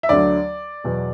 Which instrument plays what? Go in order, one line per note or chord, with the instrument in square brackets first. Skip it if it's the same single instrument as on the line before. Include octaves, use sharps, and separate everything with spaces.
[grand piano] E5
D2 D3 F#3 D5
E2 B2 F#3